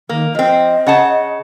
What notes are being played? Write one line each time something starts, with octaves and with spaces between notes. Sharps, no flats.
D#3 A#3
F3 C4 D#5
C#3 F#5 A5